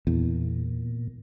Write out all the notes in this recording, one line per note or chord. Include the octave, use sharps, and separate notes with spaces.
E2 A#2